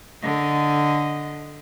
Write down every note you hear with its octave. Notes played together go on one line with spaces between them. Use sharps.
D3 D#5